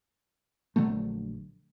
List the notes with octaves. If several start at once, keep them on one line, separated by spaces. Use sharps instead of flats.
A#1 D3 F#3 A3